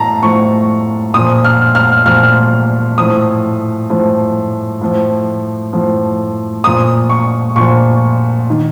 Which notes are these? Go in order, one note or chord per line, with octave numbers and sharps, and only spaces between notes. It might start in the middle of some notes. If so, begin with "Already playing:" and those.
Already playing: A2 A5 A#5
A2 F3 C#6
A#2 F3 D#6
F6
F6
A#2 F3 F6
A2 F3 D#6
A2 F3
A2 F3
A2 F3
A#2 F3 D#6
C#6
A#2 F3 C#6
D#3